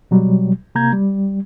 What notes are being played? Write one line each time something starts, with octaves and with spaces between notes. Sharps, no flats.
B2 F#3 G3
C3 A#3 A#5 G6 G#6
G3